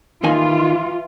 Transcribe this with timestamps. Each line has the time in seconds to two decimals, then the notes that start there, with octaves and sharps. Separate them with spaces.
0.23 D#2 D#3 E3 F4 G#5